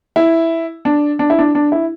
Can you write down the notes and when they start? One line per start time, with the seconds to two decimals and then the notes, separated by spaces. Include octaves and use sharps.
0.16 E4
0.85 D4
1.19 D4
1.30 E4
1.39 D4
1.55 D4
1.72 E4